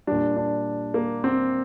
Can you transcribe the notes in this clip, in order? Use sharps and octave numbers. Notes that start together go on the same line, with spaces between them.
A#2 G3 D4
D4
A#3
C4